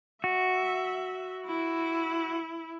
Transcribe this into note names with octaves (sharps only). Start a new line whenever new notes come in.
F#4 E5
E4